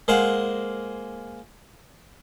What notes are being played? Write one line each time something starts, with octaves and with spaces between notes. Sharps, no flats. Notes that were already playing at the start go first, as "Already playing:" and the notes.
G#3 A#3 C5 F5 F#5